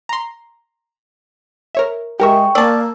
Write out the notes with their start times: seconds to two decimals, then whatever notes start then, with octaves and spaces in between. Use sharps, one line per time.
0.09 A#5 C6
1.75 A#4 C#5 E5
2.20 G#3 G4 A#4 E5 G5 C#6
2.55 A#3 D5 A5 E6